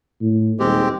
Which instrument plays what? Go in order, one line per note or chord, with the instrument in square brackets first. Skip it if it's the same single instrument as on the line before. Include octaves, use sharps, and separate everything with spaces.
[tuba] A2
[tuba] D#1 [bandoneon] G#3 C4 G4